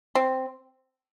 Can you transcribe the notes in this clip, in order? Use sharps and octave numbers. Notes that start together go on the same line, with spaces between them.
C4